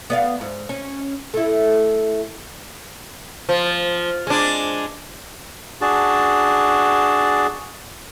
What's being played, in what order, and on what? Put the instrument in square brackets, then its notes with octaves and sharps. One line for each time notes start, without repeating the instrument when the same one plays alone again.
[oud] B3 D5 F5
G#2
C#4
A3 E4
[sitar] F3
G#3 D4
[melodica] D4 F#4 G#4 A5